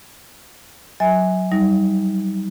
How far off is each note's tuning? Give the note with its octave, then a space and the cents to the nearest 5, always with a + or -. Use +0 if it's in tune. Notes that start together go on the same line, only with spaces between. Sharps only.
F#3 +0 E5 -30 G#5 -5
G3 -15 D#4 +30